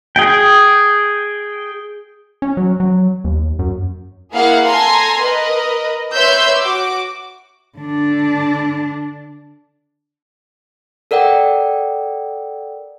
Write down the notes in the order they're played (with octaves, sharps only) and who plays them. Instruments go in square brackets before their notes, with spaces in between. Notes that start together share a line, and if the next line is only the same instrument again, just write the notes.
[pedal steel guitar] G#4 G5
[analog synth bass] C#4
F#3
F#3
D#2
F#2
[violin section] A#3 E4 G#4 F5 F#5
A4 G#5 A#5 C6
A#4 B4 D#5
B4 C#5 E5 C6 E6 G6
F#4 D6
[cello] D3 D4
[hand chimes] A4 A#4 D5 F#5 G5